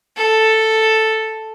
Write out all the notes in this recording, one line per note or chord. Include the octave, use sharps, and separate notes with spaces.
A4